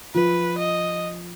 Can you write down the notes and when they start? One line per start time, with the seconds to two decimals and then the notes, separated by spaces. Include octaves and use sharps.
0.14 F3 B4
0.58 D#5